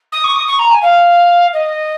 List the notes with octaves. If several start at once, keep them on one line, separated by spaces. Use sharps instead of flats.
D#6
C#6
D#6
C#6
A#5
G#5
F5
D#5